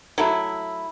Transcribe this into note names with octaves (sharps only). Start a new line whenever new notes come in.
F#3 A3 E4